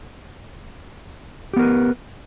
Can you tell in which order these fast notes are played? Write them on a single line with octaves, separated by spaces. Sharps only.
G4 B3 A#4 B4